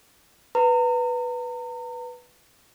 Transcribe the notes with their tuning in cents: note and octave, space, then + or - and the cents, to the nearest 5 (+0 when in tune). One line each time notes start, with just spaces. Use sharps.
B4 +0 A#5 -35